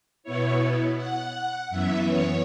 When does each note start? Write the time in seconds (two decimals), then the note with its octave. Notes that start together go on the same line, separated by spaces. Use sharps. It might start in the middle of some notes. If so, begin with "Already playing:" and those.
0.23 B2 B3 E4 C#5
0.97 F#5
1.70 F#2 E3 B3 E5
2.07 C#5